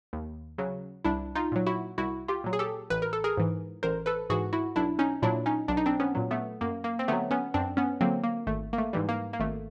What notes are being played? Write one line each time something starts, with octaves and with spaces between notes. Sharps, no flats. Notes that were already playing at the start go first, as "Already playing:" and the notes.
D#2
C#3 F#3
C2 D4 E4
D#4 F4
A#2 F#3
E4 F#4
C2 E4 F#4
F4 G4
A#2 F#3
G#4
G4 A4
A1 B4
A#4
A4
G#4 A#4
G#2 E3
A1 A#4 C5
A4 B4
G#2 E3 F#4 G#4
E4 F#4
B1 D4 E4
C#4 D#4
A#2 F#3 D4 E4
C#4 D#4
B1 D4
D#4
C4 D4
B3 C#4
A#2 F#3
A3 B3
F#2 A#3
A#3
C4
D3 F#3 A3 B3
B3 C#4
F#2 C4 D4
B3 C#4
D3 F#3 A#3 C4
A#3
G#1 A3
A#3
A3
G#2 E3 G3
A#3
A#3
G#1 A3